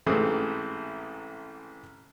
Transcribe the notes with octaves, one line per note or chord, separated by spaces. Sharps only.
A1 G#2 E3 A3 C4 D#6